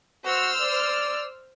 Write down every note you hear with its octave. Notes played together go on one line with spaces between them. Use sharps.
F#4 C5 E6 F6
D5